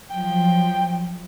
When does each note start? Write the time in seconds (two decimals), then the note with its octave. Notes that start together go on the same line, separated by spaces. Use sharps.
0.10 F3 F#3 G5